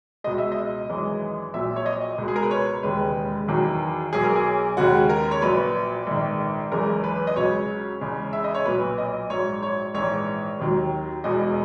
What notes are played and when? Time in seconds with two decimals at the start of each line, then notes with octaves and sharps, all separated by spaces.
0.24 C#2 B2 G#3 D#5
0.38 E5
0.52 D#5
0.89 G#1 F#2 E3 G#3
1.54 A#1 A#2 F#3 E5
1.76 C#5
1.86 D#5
2.18 C#2 B2 G#3
2.28 G#4
2.36 A#4
2.43 B4
2.51 C#5
2.83 E1 D#2 C#3 G#3 B4
3.48 E2 D#3 F#3
4.13 B1 B2 F#3 G#4
4.24 A#4
4.35 G#4
4.77 D#2 C#3 G#3 F#4
5.09 A#4
5.31 C#5
5.42 A#1 A#2 F#3 B4
6.07 A#1 G#2 D#3
6.71 F#1 E2 C#3 E3 G#3 A#4
7.04 B4
7.27 D#5
7.36 C#2 C#3 F#3 C#5
8.01 E2 C#3 G#3
8.33 E5
8.44 D#5
8.54 C#5
8.65 B1 A#2 F#3 B4
8.98 D#5
9.30 A#1 G#2 F#3 C#5
9.63 C#5
9.94 A#1 G#2 E3 C#5
10.59 D#2 D#3 F#3
11.24 E1 E2 B2 D#5